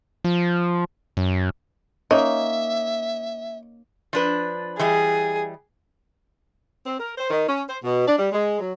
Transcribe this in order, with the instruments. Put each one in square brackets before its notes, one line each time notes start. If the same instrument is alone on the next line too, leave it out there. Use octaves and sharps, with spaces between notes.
[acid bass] F3
F#2
[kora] A#3 C#4 D#4 [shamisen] D#5 [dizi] E5
[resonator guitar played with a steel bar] F3 D4 B4
[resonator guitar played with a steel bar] E3 G3 D#5 [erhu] G#4
[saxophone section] C4
A#4
C5
D#3
C#4
C5
B2
D4
G3
G#3
F#3